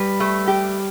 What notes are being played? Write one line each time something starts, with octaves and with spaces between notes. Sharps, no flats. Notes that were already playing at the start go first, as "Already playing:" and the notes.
Already playing: G3 B4
A3
G4